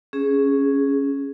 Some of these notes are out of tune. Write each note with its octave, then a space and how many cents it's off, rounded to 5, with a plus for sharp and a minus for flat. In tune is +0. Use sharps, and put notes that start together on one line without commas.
C#4 +0 G#4 +0